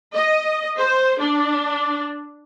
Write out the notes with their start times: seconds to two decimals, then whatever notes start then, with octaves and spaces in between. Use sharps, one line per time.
0.14 D#5
0.78 C5
1.20 D4